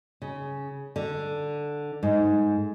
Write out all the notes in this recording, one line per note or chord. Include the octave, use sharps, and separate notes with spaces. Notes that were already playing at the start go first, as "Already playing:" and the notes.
C#3
D3
G#2